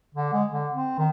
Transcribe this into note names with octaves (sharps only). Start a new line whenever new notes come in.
D3
G#3
D3
C4
D#3